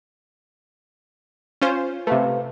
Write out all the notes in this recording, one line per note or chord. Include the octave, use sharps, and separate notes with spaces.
C#4 F4 C5
C3 A3 B4 F5